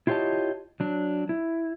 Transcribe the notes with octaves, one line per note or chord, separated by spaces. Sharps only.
E4 F4 G4 C#5 D#5 A5
F#3 D4
E4